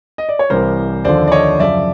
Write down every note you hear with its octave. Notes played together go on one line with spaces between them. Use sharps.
D#5
D5
C#5
C2 C3 E3 A#4 C5
D#2 D3 F3 C5 D5
D5
C#5 D#5
F#2 C#3 F3 D5 E5